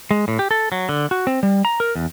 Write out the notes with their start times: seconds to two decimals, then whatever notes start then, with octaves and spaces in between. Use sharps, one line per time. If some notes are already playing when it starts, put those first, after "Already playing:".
0.11 G#3
0.28 A2
0.39 G4
0.51 A4
0.72 F#3
0.89 D3
1.11 F#4
1.27 C4
1.43 G3
1.65 A#5
1.80 A#4
1.95 E2